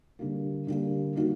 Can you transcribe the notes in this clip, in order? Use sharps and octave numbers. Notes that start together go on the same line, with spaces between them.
D3 G3 A#3
D3 G3 A#3
D#3 G3 A#3 D#4 F#4